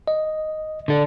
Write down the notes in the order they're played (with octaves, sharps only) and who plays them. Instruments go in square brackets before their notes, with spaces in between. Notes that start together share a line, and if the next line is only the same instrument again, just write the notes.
[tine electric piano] D#5
[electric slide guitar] D3 A4